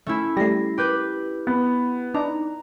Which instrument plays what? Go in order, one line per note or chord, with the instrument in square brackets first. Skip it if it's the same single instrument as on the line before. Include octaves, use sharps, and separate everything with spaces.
[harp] A3 C#4 E4
[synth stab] G3 A3 [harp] A#6 C7
[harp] G4 B4 G6
[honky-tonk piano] B3
[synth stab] D4 D#4 [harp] A#5